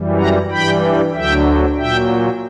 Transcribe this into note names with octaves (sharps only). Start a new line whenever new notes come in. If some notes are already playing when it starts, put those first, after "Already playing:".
Already playing: F#2 E3 G3
F#5 A#5
G2 E3 G3 G5 B5
D2 D3 F#3 E5 G5
A#2 F#3 E5 G5